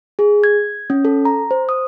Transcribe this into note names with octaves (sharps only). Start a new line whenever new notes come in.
G#4
G#6
C#4
A4
A#5
C5
D#6